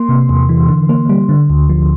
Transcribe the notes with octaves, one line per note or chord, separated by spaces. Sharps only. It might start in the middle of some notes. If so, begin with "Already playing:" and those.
Already playing: A#3 C6
C3
E2
E3
D3
A#3
G3
D3
D2
F3